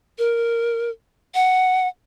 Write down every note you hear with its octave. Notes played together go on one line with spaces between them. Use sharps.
A#4
F#5